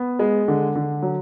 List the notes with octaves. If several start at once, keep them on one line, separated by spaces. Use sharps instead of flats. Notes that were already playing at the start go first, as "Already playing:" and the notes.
Already playing: B3
G#3
D3
D3
F#3